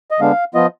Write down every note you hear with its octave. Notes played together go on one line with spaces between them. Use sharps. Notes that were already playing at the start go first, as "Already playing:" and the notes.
D#5
D3 G#3 B3 D4 F5
F3 B3 F4 D#5